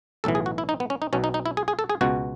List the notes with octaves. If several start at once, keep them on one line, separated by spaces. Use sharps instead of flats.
B1 A2 E3 A4
G#4
F#4
E4
D#4
B3
C#4
D#4
B1 B2 C#4
D#4
D#4
E4
G#4
G#4
A4
G#4
C#2 B2 F#4